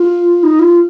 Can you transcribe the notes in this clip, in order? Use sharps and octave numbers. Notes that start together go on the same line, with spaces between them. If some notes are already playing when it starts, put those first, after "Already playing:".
Already playing: F4
D#4
F4